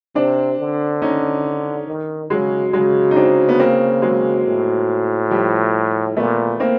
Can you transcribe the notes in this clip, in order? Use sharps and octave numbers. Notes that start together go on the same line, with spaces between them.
C3 C4 D4
D3
C#4 D#4
D#3
C#3 F#3 G#3
C#3 F#3 G#3
D#4
C4 D4
B3
A#3 C4
F#3 G#3
A2
F3 G3
A#2 A3 B3
A#3 C4